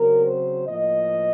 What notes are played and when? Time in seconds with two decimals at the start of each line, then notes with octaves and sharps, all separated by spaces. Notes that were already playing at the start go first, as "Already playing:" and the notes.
Already playing: C#3 F#3 C4 A#4
0.26 C5
0.68 A2 F3 A#3 D#5